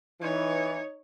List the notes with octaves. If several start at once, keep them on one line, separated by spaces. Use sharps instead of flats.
E3 D#4 C#5